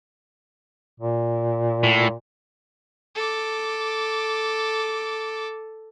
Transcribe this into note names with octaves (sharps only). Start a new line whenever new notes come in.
A#2
A2
A4 D6